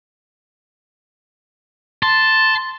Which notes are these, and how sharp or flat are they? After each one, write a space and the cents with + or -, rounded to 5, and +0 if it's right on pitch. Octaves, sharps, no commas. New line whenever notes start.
A5 +0 C6 -5